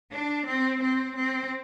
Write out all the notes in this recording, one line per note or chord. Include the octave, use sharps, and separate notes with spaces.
D4
C4
C4
C4